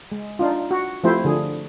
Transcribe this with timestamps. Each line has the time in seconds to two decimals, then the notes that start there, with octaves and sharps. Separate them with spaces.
0.12 G#3
0.39 D4 D#4 F4
0.71 F#4
1.04 F3 A3 C4 E4 G4 C5
1.25 D3 F3 G#4